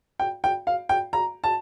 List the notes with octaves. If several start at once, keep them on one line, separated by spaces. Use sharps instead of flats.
G5
G5
F5
G5
A#5
A5